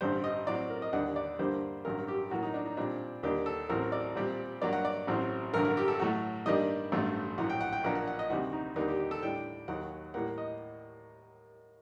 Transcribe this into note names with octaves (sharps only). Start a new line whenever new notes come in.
A1 G2 D3 G3 C5
D#5
A2 F#3 C4 D5
A#4
D#5
D#2 D3 G3 A#3 D4 F#5
D5
G2 D3 G3 A#3 D4 C5
A1 G2 F#3 A#4
G4
A2 F#3 A#3 F#4
D#4
D4
D#4
A#2 G3 C4 D4
D#2 D3 G3 A#3 D4 G4
A4
A1 A2 F#3 C4 A#4
D5
A#2 G3 C4
G2 F#3 A#3 D5
F#5
D5
A1 A2 F#3 C4
A1 G2 D3 F#3 A#4
A#4
G4
A4
A2 F#3 A3 F#4
G2 D#3 G3 A#3 D4 D#5
A1 G2 F#3 A3
A#1 A2 F#3 F#5
G5
F#5
G5
A#1 A#2 F#3 A#3 D4 F#5
F#5
F#5
D#5
D2 C3 D#3 G3 F#4
D#4
D#2 D3 G3 A#3 D4 D#4
G4
G4
A4
A2 G3 D4 G5
D#2 D#3 F#3 F#5
A2 G3 A#3 F#5
D#5